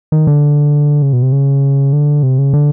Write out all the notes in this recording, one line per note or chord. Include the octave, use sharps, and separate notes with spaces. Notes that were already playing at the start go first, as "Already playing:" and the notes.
D#3
D3
C#3
B2
C3
C#3
D3
C3
C#3
D3